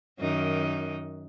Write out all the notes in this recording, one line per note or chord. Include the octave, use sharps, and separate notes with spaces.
F#2 D#3 D#4